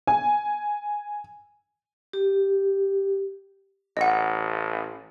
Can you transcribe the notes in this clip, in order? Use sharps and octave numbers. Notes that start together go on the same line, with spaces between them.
G#5
G4
A1 D#5 F#5